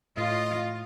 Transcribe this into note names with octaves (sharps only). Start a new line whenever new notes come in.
A2 F4 D#5